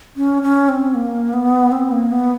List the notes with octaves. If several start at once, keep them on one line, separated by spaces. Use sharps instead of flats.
C#4
C#4
C4
A#3
B3
C4
A#3
B3